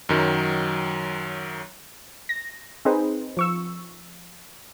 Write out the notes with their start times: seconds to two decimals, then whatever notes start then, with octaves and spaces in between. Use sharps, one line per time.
0.09 F#2 D#3 F#3
2.29 A#6
2.85 C4 D#4 G#4 B4 C5
3.37 F3 C#6 E6